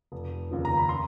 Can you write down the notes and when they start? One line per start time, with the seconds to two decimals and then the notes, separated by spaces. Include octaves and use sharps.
0.12 F1
0.51 D#2 C#3 F3
0.65 A#5
0.77 B5
0.89 C6